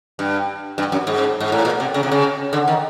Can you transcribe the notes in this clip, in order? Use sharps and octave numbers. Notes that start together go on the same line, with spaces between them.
G2
G2
F#2
G#2
G#2
A2
A#2
C3
C#3
C3
C#3
D3
D#3